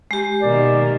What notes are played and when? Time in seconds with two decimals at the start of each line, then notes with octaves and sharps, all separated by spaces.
0.11 G#3 G4
0.42 B2 D#3 A#3 D5